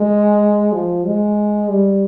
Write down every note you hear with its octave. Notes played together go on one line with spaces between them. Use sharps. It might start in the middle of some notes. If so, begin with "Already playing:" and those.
Already playing: G#3
F3
G#3
G3